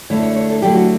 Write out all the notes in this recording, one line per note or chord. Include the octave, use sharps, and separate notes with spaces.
D3 A3 E4 C#5
C#5
C#5
A4
D3 F#3 A3 E4 G4
F#4